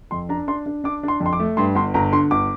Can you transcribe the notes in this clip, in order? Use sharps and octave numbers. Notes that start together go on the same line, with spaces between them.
F2 C6
D4 A#5
D4 C6
D4
D4 D6
D4 C6
F2
C6
D6
A3
G2 C6
G1 C6
G1 A#5
D3 C6
G1 D6